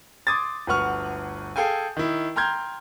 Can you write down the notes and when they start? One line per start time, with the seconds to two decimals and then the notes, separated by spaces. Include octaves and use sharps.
0.27 C6 D6 D#6 G#6 A6
0.67 G1 D2 B4 F#5 C#6 F6
1.56 G#4 A4 F5 G5 G#5
1.97 D#3 E4
2.36 G5 A#5 C6 F6 G6 G#6